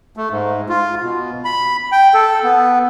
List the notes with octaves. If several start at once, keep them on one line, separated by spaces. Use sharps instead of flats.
A3
G#2
F4
B2
B5
G5
A4
B3